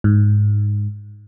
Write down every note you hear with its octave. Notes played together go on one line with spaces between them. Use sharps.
G#2